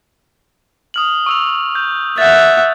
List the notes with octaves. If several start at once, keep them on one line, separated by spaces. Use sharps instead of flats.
D#6 F6 F#7
C#6 E6 F7
G6
E5 F#5 G6 A6